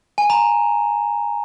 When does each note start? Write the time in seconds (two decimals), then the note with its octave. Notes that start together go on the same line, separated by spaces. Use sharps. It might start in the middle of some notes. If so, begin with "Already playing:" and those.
0.18 G#5
0.30 A#5